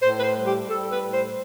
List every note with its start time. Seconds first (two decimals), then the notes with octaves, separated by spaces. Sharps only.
0.02 A2 C5
0.18 B4
0.24 C5
0.36 G3
0.47 G4
0.69 G3 A4
0.91 B4
1.03 A2
1.14 C5